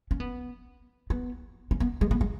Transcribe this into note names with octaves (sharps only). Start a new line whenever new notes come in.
C#4
B3
B3
C#4
B3
G#3
B3
G#3